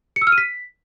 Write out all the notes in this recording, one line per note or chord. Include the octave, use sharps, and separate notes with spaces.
C#7
E6
F6
D#7
B6